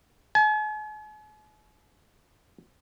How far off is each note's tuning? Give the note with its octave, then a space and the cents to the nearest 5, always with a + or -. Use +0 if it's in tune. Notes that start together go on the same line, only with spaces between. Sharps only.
G#5 +45